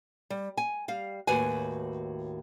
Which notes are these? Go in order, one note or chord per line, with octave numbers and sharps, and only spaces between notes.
G3
G#5
G3 F5
D#2 A2 F#4 B4 G#5